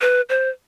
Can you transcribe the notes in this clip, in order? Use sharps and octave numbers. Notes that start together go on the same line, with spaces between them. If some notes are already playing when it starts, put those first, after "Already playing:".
B4
C5